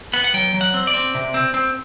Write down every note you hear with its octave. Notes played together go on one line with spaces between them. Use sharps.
B3 F#5
F#5
F#3 G5
F#3
F#5
C4
D5
C4
C3
C4
C4